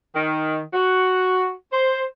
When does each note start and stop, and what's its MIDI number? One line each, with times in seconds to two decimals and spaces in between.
0.14 0.60 51
0.74 1.51 66
1.71 2.03 72